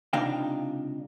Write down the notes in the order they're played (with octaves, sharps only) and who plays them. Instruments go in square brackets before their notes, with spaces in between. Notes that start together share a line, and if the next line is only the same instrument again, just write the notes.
[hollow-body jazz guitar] C#2 C3 D4 D#4 F5 G5